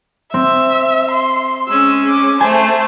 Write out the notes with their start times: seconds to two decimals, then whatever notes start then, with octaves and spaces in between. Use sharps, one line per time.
0.34 C4 E5
1.11 C6
1.68 G#3 C#4 E6
2.10 D6
2.41 A3 C5 G#5 A5